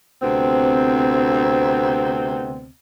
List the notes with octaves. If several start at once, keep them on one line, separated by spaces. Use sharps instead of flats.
D2 C3 B3 C4